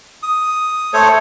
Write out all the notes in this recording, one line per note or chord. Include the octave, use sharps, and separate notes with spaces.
D#6
A3 A4 C5 C#5